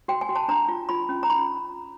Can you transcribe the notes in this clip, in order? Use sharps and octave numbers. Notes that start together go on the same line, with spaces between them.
F#4 G5
G#5
F#4
A5
D4 A#5
F4
F4 B5
C#4
A#5
D#4 B5